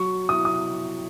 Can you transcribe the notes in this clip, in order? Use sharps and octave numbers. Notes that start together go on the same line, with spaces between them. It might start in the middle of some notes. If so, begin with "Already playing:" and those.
Already playing: F#3 C#6
E4 D#6
D#6